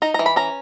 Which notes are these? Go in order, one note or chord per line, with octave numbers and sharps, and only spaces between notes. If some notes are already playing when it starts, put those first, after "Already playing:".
D#4 A#5
A#5
E3
B5
C#4 A#5